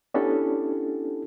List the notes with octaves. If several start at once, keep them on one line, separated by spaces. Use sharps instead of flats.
B3 C#4 D4 E4 G4 A4